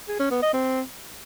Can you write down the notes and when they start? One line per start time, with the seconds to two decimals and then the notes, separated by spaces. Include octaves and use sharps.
0.08 G#4
0.20 C#4
0.31 B3
0.42 D#5
0.53 C4